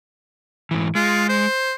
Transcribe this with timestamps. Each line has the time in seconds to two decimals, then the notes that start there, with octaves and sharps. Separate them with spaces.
0.71 G#2 E3
0.95 G#3 F4
1.29 C5